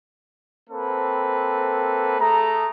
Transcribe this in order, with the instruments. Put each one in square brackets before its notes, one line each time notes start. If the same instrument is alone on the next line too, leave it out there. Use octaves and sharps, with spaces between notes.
[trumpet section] A#3 C4 A4 B4
A3 G#4 A#5